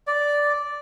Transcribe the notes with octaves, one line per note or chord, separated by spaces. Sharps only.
D5